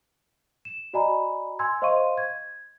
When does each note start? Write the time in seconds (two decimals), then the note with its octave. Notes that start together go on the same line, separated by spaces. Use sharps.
0.65 E7
0.93 F#4 D5 D#5 G#5 A#5 B5
1.59 G#5 C6 E6 G#6
1.82 C5 D#5 F5 C6 C#6 D#7
2.18 G#6